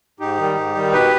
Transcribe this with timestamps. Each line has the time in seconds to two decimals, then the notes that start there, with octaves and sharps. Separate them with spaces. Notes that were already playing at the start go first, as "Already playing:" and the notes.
0.20 G#2 D#4 G4
0.38 D#3 G3
0.56 G#2
0.75 D#3 G3
0.92 B2 G4 B4